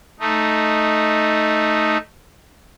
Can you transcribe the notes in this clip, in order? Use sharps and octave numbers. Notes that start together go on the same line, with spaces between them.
A3 D#4